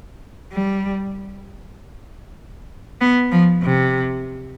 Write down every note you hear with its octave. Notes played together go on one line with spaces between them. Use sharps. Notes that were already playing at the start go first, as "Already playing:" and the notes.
G3
B3
F3
C3